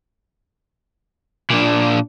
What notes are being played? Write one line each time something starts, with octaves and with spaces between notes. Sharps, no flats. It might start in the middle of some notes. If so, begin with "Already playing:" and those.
A#2 D4